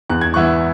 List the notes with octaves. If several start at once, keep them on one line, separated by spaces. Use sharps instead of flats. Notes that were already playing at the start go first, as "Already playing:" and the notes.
E2 F#6
G#6
E3 B3 E4 C#6 F#6